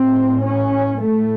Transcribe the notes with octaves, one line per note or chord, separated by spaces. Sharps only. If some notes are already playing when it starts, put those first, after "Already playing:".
Already playing: A2 C4
C#4
A2 A3